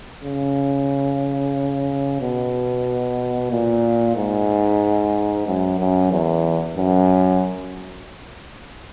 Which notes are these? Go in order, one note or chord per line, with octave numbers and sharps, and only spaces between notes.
C#3
B2
A#2
G#2
F#2
F#2
E2
F#2